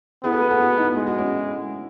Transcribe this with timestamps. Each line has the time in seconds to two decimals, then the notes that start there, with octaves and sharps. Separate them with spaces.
0.23 B3 E4 G#4
0.32 F#4 A4
0.41 G#4 B4
0.51 F#4 A4
0.60 E4 G#4
0.77 D#4 F#4
0.95 G#3 E4
1.07 F#4
1.18 C#4 E4